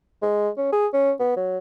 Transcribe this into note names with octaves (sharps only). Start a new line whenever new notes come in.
G#3
C#4
G#4
C#4
B3
F#3